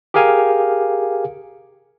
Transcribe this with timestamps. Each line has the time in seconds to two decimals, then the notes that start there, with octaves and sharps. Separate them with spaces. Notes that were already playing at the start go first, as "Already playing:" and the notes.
0.14 G4 G#4 A#4 F5 G#5